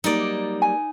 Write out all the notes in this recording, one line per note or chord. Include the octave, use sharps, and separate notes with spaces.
F#3 G3 A#3 D#4 D5
G#5